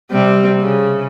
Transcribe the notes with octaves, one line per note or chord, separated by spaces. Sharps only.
C3 G3 C4
C#3